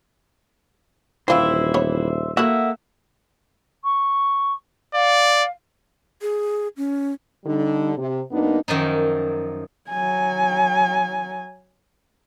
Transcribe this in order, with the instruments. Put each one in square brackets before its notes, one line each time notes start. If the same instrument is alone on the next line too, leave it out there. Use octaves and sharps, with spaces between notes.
[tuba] D#1 [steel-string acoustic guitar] E3 E4 [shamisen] C4 F4 [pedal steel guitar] C5 E5
[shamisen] B3 C#5
[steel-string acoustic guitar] A#3 A4 [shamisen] E4 F#4 [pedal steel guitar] E5 F#5
[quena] C#6
[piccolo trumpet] D5 [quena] F5
[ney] G#4
C#4
[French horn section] D3 G3 D#4
C3
F#2 A#3 B3 D4 D#4
[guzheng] F#2 D#3 F3 D#4
[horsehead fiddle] F#3 G#5